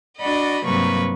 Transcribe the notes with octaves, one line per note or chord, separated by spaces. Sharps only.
D4 F#4 D5 D#5 B5
G2 C3 F#3 A#3 B4 C#6